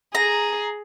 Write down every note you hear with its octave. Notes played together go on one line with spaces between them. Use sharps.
G#4 A#5